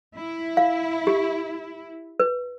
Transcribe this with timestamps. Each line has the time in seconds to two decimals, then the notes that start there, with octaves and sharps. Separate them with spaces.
0.18 E4
0.57 F5
1.07 G4
2.20 B4